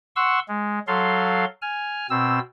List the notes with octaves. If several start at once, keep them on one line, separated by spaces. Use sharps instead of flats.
F#5 C6 C#6 E6
G#3
F#3 A4 F5 C6
G#5 F6
B2 C4 E6